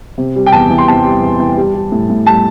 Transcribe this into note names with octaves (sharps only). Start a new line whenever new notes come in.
C3
G3
G5
E2 A5
E3
C6
C3 A5
G3
E2
E3
G3
G3
A2
A2
G3 A5